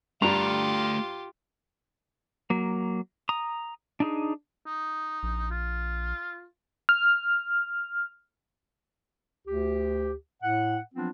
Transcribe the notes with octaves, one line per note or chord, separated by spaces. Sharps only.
G2 G3 A3 F4 G4 D5 A#5
F#3 A#3
A#5 D#6
D4 D#4 G#4
D#4
A#1
F4
F6
D2 G4
A2 F#5
F3 F#3 B3 C4 D4 F4